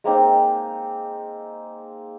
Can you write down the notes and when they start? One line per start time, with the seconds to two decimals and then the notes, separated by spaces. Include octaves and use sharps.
0.04 G#3 A#3 C4 D#4